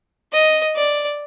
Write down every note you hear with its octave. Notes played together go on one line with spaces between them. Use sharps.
D#5
D5